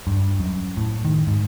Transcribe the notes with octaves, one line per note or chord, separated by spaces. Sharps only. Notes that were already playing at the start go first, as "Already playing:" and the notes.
G2
F#2
A2
D#3
G#2